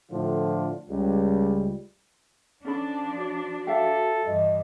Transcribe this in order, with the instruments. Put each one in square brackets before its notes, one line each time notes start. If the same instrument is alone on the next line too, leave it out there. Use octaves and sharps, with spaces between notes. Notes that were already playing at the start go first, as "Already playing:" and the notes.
[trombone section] A2 D3 F3 D4 F4
C#2 G3
[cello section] F3 D4 [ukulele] C#4 A4 B5
[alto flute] F#4 [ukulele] C#5
[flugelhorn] A4 [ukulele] E5 F5 G5
[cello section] G2 E3 [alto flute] D#5